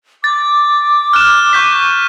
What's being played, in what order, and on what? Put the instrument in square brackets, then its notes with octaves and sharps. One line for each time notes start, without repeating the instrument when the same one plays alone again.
[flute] D6 [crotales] A6
[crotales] F6 F#6 E7
C#6 G6 B6